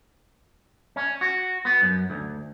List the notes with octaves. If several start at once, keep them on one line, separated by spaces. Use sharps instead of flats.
C#4
F#4
B3
F#2
D2